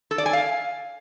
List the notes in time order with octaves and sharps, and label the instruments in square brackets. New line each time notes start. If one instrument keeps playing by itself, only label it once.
[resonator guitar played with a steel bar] A4
D5
G#5
F5